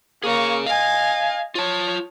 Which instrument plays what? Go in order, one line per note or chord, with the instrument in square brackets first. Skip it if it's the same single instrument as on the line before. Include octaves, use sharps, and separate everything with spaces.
[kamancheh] A#3 C#6 [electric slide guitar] G#4 C#5
[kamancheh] D#5 G#5 [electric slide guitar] F5
[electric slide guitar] F4 A5 [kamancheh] C#5